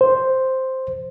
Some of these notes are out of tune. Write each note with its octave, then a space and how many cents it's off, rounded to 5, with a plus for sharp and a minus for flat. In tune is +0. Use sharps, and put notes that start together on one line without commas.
C5 +0